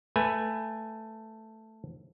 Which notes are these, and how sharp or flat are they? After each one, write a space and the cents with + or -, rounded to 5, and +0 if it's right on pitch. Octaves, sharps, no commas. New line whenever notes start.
A3 +5 B4 +0 G#5 +0